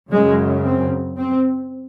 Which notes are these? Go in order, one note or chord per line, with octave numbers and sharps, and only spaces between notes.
F#2 C#3 G#3
C4
C4